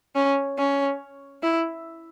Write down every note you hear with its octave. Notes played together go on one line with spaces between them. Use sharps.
C#4
C#4
E4